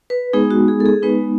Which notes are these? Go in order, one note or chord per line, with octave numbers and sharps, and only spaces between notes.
B4
G#3 B3 D#4 G#4
F#4
G#4
A4
G#4
G#3 B3 D#4 B4